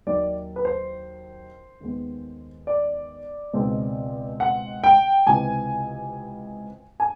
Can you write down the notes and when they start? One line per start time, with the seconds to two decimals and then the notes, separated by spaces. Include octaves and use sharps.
0.07 D#2 D#3 F#3 D5
0.56 B4
0.65 C5
1.80 D#2 D#3 G#3 B3
2.67 D5
3.53 C#2 B2 G#3 C4 D#4
4.40 F#5
4.84 G5
5.27 C#2 C3 E3 G#5
7.00 G#5